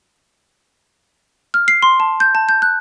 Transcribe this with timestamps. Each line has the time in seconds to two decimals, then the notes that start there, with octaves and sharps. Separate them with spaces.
1.54 F6
1.68 C7
1.82 C6
2.00 A5
2.20 G6
2.35 A5
2.49 G6
2.62 F#6